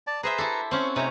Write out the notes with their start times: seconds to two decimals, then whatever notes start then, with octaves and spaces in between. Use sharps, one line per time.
0.07 D5 A5
0.23 G#4 B4 C5 E5 A#5
0.38 E4 G4 A4
0.71 C4 C#4 C5 F#5
0.96 C3 A3 C#4 D#4 C#5 A#5